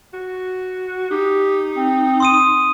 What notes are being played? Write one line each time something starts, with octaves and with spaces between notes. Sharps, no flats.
F#4
D#4 G4
C4
C6 D#6 D#7